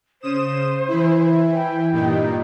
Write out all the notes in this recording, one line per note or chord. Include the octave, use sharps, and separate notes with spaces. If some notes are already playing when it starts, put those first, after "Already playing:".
C#3 C5 D#6 E7
E3 E4
G5
G2 A#2 D#4